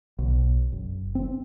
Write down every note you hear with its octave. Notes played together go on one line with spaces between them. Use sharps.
B1
F#1
C4